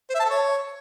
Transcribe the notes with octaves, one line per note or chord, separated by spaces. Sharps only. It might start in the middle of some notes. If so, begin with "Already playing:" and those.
C5
E5
A5
A4
C#5